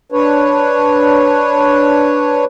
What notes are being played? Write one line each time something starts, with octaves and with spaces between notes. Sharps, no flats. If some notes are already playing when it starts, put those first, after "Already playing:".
D4 B4 C#5